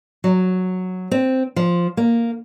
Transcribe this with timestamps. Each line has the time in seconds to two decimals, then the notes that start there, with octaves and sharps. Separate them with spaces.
0.24 F#3
1.11 C4
1.56 F3
1.97 A#3